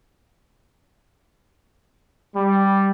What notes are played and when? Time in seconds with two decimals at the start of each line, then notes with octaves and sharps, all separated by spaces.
2.35 G3